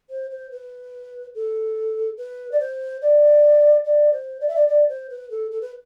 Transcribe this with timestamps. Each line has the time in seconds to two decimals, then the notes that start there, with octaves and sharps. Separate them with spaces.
0.10 C5
0.30 C5
0.51 B4
1.35 A4
2.17 B4
2.51 D5
2.59 C5
3.01 D5
3.85 D5
4.12 C5
4.40 D5
4.48 E5
4.55 D5
4.68 D5
4.88 C5
5.10 B4
5.30 A4
5.51 A4
5.61 B4